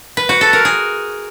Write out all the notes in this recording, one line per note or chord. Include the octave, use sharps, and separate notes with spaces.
B4
F#4
A4
A#4
G#4